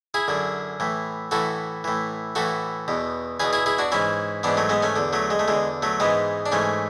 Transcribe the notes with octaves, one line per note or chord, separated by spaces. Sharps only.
E4 G#4
F#2 D3
A2 E3
A2 E3 F#4 A4
A2 E3
A2 E3 F#4 A4
E2 B2
E2 B2 G#4 B4
E4 G#4
E4 G#4
D4 F#4
G#2 E3 C#4 E4
G#2 E3 B3 D4
F#3 A3
G#3 B3
A3 C#4
E2 D3
F#3 A3
G#3
A3
E2 D3 G#3
F#3 A3
G#2 E3 G#3 B3
D4
G#2 E3 A3 C#4